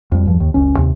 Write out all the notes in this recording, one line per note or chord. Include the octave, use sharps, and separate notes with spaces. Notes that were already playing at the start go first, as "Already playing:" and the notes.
F2 G3
G#1 E2 G2 F3
D#2
F#1 C#2 C#4
D#2 C3